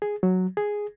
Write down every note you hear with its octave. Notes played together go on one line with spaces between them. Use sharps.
G#4
F#3
G#4